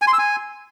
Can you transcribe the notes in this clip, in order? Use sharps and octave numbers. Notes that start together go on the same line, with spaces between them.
G#5
C6
E6
G#5